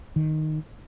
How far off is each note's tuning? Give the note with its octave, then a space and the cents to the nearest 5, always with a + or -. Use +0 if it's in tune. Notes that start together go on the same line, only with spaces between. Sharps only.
D#3 -5